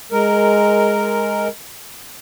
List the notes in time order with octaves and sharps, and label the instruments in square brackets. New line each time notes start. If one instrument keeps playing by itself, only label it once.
[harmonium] G#3 A#4